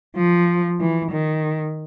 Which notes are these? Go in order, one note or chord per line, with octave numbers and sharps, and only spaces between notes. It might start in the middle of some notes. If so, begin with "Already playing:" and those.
F3
E3
D#3